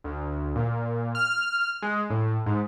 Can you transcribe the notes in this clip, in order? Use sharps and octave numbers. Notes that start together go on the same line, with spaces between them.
D2
A#2
F6
G#3
A2
G#2